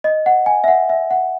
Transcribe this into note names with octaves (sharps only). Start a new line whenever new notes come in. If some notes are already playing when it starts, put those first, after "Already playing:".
D#5
F#5
G#5
E5
F#5
E5
F#5